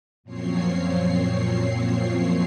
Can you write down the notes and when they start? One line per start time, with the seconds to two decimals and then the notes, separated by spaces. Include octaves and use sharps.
0.24 F#2 A#2 F3 C4 C#5 C7